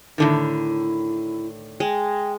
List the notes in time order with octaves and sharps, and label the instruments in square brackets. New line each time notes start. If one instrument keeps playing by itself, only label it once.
[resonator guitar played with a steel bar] A2 D3 D#3 [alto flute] E4
[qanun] G#3 [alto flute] G5